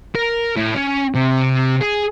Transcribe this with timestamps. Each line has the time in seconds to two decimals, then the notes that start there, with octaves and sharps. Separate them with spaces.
0.16 A#4
0.56 A2
0.75 C#4
1.15 C3
1.81 G#4